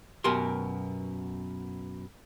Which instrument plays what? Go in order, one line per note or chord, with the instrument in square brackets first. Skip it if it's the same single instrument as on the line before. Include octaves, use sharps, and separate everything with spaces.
[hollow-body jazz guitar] F#2 B2 G4 A#4 C6